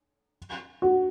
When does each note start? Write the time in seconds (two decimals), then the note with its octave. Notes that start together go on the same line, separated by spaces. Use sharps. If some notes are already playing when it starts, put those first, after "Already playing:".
0.82 F#4